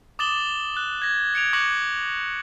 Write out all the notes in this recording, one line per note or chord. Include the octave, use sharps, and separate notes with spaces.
D6 D#6 A6 E7 F#7 G7
F#6
G#6 A#6
G#6 C#7 D7 F7
C#6 D6 F#6 A#6 C#7 F#7